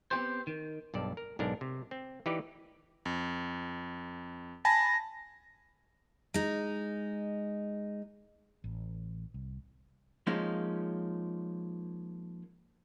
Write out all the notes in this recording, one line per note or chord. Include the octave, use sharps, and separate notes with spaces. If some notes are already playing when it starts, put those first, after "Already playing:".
B3 C4 D#4 G4 C5
D#3
B1 G2 D5 A5
A#4
B1 G#2 D4 A#4
C3
C4
E3 D#4 G4 B4 D5
F2
G#5 A5 B5 A#6
G#3 D#4
A1
C2
F3 G#3 A#3 C#4 D#4